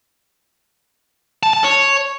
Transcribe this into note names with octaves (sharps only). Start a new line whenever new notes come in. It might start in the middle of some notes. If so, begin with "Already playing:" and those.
A5
A5
C#5